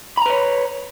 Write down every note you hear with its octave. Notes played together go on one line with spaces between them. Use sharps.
B4 C#5 A#5 B5